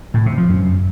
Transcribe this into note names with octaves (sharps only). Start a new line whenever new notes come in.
A2
C3
F3
F#2